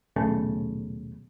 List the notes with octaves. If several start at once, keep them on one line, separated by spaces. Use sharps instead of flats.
D#1 B1 C#3 A3